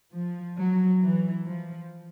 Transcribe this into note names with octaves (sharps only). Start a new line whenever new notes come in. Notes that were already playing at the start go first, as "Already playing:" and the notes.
F3
F#3
E3
F3